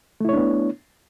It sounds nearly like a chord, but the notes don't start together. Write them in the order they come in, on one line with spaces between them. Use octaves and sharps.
A3 E4 C#5 D4 B3